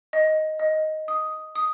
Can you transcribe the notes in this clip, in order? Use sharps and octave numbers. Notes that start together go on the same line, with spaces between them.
D#5
D#5
D#6
D#6